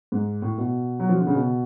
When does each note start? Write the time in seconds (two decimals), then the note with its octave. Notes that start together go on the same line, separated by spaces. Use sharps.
0.12 G#2
0.42 A2
0.58 B2
1.00 F#3
1.09 F3
1.18 D3
1.27 C#3
1.35 B2